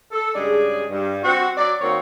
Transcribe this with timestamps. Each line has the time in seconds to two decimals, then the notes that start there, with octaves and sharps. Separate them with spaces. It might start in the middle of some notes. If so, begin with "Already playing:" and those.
0.12 A4
0.35 G2 C#3 G#3 G#4 D5
0.90 G2
1.23 C4 F#4
1.57 F#3 D5
1.82 D#3 A#3 C4 F#4 C#5